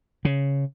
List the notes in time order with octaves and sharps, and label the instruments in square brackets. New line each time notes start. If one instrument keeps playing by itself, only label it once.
[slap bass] C#3